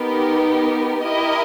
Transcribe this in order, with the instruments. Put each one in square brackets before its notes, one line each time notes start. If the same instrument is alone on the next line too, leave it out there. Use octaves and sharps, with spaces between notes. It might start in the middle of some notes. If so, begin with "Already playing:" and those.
Already playing: [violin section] B3 D#4 G4 A#4
E4 G4 A#4 D#5